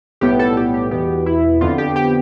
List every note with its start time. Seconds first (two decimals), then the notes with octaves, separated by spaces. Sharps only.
0.21 B1 A2 G3 B3 G4
0.39 A4
0.57 G4
0.74 G4
0.91 E2 B2 B3 G4
1.26 E4
1.61 F2 D3 F3 B3 F4
1.78 G4
1.96 G4